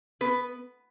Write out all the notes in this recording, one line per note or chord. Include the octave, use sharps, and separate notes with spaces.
B3 B4